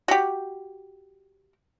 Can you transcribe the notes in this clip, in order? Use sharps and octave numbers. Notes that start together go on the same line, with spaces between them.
F#4 G4